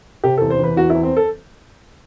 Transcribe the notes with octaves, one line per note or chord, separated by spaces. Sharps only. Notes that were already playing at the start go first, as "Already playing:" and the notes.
C3 G4
E2 A4
C5
E3 B4
E2 F#4
E4
E2
C4
A4